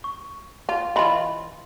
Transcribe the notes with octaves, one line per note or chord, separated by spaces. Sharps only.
C#6
F4
E3 F4 D#5 B5 C6